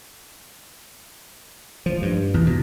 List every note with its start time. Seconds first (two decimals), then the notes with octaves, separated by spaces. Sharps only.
1.86 F3
2.02 G2
2.34 E2
2.47 B2